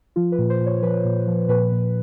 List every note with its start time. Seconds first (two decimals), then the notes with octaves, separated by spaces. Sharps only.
0.16 F3 F4
0.32 B4
0.39 A#2
0.50 C5
0.61 A#2
0.66 C#5
0.82 F3 B4
1.05 A#2
1.27 F3
1.49 A#2 B4
1.72 A#2